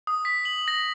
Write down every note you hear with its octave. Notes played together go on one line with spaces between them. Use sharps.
D#6
B6
F#7
A#6